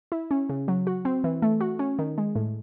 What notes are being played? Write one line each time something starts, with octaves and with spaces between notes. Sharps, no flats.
E4
C#4
C#3
F#3
F#4
C4
E3
A3
F#4
C#4
D#3
G#3
A2